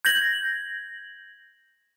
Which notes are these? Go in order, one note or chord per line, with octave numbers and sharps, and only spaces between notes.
G6 G#6 A#6 F#7